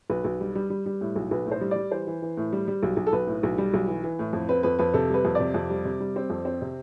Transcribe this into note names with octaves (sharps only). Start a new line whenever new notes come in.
B1 B4
B1
G3
G3
G3
G3
A2
B1
B1 B4
A2
C5
G3
G3 D5
E3 C5
E3
E3
A2
G3
G3
B1
B1
A4
B1 B4
A2
B1
G3
B1
E3
E3
A2
F2
C4 B4
F2 B4
F2 B4
C3 A4
G3 B4
F2
C3 D5
F2
G3
C3
G3
C4
F2
C4
C3